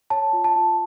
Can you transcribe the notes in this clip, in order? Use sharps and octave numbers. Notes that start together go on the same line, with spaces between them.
C#5 A5
F4
A5
F4